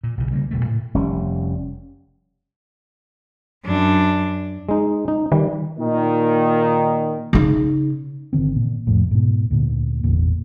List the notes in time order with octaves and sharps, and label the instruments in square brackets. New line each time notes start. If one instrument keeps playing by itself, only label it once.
[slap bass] A#2
B1 C#3
C#3 G3 G#3 A#3
D#1 B2 F#3 A3
A2
F1 G3 C#4
[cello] F#2 D4
[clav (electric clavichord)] G#3 D#4
D#4
[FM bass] D#3 [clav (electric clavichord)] G3
[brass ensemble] A#2 D#3
[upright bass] C#3 D#4
[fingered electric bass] G1 D3 D#3 C4
A#2
C2 F2 A2
G#2 B2
D2 A#2
G#1 E2 A#2